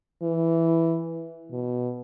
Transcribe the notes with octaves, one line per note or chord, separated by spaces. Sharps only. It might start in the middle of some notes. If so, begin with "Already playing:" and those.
E3
B2